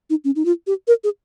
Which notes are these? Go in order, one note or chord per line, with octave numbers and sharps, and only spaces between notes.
D#4
C#4
D#4
F4
G4
A#4
G#4